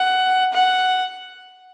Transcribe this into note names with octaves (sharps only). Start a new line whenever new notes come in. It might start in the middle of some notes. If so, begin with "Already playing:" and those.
Already playing: F#5
F#5